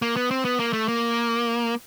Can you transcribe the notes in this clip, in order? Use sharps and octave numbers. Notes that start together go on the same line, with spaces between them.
A#3
B3
C4
B3
A#3
A3
A#3